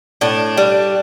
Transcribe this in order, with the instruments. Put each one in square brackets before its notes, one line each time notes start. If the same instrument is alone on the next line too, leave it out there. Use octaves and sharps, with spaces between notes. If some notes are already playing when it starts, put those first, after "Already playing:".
[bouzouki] A2 D4
G3